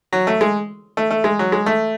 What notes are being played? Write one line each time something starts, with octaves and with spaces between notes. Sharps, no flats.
F#3
A3
G#3
A3
A3
G#3
F#3
G#3
A3